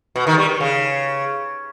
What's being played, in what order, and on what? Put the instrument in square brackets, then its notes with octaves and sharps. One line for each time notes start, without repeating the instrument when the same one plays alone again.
[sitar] B2
D#3
G#3
G3
D#3
C#3